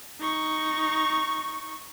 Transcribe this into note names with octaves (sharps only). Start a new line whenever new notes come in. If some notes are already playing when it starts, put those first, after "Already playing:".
D#4 C#6